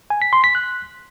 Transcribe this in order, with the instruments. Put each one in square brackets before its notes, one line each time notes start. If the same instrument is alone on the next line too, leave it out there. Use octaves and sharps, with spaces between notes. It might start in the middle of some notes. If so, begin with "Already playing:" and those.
[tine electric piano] G#5
B6
C6
B6
F#6